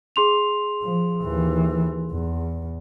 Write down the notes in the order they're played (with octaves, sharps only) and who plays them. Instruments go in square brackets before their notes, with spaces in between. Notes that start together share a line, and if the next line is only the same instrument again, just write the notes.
[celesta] G#4 C6 F7
[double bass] F3
D#2 E3
E2